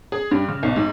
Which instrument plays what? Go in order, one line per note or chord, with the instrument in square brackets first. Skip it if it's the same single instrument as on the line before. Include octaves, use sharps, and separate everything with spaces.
[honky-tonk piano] G#4
G2
C#3
B1
G#2